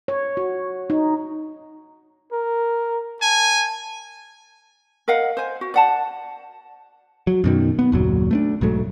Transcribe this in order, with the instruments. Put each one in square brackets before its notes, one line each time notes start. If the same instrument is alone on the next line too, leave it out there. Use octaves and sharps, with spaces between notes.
[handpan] C#5
F#4
D#4
[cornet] A#4
[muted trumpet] G#5 [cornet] A5
[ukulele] A#4 D#5 F5 F#5
C5 G#5
F#4
D5 F#5 A5
[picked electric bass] F#3
F#2 B2 D#3
B3
F#1 D#2 A#2 F#3
A3 A#3 D4
B1 G#2 F#3 A3